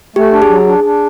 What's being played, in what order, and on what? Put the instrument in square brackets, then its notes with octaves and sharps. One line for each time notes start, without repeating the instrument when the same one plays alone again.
[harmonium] A3 [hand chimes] G4
[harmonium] D4
[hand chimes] G#4
[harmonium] F#3
D4
D4